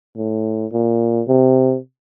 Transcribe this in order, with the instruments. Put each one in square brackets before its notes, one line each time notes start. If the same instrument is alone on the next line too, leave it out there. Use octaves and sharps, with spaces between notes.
[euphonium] A2
A#2
C3